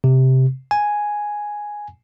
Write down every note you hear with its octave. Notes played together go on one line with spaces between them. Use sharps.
C3
G#5